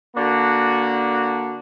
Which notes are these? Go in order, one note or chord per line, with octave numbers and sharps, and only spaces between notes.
D3 A#3 D4 F#4